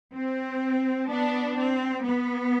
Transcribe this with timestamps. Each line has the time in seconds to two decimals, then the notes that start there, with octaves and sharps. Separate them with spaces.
0.14 C4
1.09 B3 D4
1.57 C4
2.03 B3